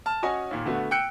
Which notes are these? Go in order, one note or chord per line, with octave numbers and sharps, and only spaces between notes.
A5 F6
C#4 F#4 C#5 D#5 G#5
D#2 A#2
D3 A3 B3 F#4
G5 E6 F#6 C#7 D7